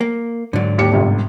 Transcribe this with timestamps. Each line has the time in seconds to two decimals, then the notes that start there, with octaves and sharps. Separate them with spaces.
0.01 A#3
0.53 G#2 D3 F#3 D5
0.78 D#2 G4 C#7
0.92 G1 G2 C3